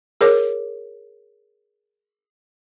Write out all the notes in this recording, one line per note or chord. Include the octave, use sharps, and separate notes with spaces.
G#4 A#4 C#5 D6